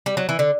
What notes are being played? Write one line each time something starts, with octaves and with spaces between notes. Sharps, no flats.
G3
F#3
E3
D3